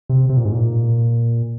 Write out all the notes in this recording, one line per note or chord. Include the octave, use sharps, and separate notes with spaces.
C3
C3
A#2
G#2
A#2